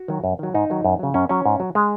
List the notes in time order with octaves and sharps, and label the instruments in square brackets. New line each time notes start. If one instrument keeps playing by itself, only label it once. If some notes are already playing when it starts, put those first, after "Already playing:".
Already playing: [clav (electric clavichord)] F#4
D#3 F#3
F#2
D#3 F#3
G#2 D#4
D#3 F#3
F#2
C#3 F#3
F#2 C#4
F#3 C#4
G#2
F#3
G#3